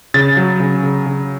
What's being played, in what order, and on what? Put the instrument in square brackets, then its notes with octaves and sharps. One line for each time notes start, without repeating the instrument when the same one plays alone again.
[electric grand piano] C#3 A6
F#3
C#3
C#3
C#3